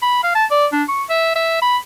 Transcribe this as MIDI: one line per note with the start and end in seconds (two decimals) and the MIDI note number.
0.02 0.20 83
0.24 0.32 77
0.35 0.45 81
0.51 0.66 74
0.72 0.83 62
0.88 1.03 85
1.10 1.34 76
1.36 1.59 76
1.62 1.78 83